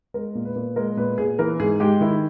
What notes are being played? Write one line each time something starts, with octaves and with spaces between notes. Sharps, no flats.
G#3 A#4
A#2
B4
A#2
G#3 A#4
A#2 B4
A#2 G#4
E3 A#4
G#2 G#4
G#3 G4
D#3 E4